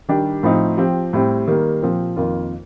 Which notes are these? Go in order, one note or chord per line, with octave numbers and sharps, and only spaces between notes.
D#3 G3 D4 G4
A2 F3 C4 D#4
F3 C4 G4
A2 G3 C4
D#3 G3 A#3
A#2 F3 C4 G4
F2 D#3 A#3 F4